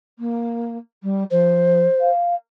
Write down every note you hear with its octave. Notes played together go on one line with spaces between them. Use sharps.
A#3
G3
F3 C5
F5